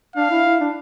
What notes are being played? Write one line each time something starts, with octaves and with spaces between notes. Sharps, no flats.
D4 F5
E4
E4
D4